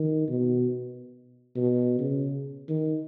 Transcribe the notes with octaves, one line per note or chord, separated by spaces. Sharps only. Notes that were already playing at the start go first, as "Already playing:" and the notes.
Already playing: D#3
B2
B2
C#3
D#3